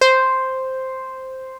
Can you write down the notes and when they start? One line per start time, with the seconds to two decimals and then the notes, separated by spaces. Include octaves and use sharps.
0.01 C5